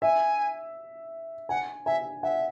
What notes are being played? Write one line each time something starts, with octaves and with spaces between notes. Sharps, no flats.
E5 G#5
F#5 G#5
E5 G#5
E5 F#5